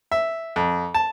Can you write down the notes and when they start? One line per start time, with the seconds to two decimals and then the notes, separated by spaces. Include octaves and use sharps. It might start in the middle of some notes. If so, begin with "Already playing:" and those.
0.12 E5
0.56 F2
0.95 A5